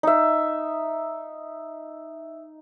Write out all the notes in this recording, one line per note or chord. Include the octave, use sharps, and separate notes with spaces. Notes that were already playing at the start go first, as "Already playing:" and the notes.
D#4 E5